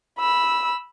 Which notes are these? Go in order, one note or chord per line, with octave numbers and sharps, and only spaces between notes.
B5 E6